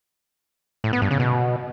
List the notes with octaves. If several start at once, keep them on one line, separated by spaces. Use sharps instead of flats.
A2
B3
G2
C#3
B2